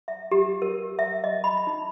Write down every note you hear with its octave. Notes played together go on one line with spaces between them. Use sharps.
E5
G4
A#4
E5
D#5
B5
D#4